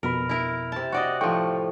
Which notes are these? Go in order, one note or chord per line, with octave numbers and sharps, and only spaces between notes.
F2 B2 A#4 B5
E4 A#4
C3 A5
F#4 D5 D#5
A2 F3 G5 C#6